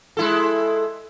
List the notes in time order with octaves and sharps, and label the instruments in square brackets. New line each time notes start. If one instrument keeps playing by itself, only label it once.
[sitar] G#3 E4 A4